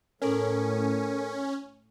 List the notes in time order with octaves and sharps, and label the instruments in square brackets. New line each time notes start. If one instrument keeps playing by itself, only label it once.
[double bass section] A2 [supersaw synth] C#4 [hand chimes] A4 A#4